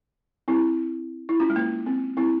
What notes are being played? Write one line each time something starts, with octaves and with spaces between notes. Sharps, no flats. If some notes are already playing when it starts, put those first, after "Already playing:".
C4 E4
E4
C#4 F4
G#3
A#3
C4
C4 E4